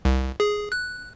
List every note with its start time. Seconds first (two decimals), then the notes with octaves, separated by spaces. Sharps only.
0.05 C2
0.40 G#4
0.72 F#6